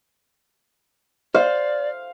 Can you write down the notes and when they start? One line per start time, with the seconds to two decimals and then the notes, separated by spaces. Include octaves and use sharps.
1.34 C5 D5 F5